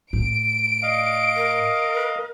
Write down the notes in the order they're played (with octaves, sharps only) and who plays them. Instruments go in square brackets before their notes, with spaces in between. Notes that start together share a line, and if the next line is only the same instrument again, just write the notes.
[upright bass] A2 [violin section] D7
[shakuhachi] D5 [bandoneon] D#5 F5
[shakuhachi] A#4